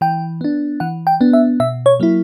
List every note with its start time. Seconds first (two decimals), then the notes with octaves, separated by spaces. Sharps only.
0.01 E3 G5
0.41 B3 D4
0.80 E3 F#5
1.07 G5
1.21 B3 D4
1.33 E5
1.60 B2 E5
1.86 C#5
2.00 F#3 A#3 E4